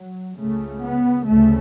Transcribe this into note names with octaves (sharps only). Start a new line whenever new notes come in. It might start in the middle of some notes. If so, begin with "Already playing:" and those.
Already playing: F#3
C#2 C#3 A3
B3
D2 C#3 A3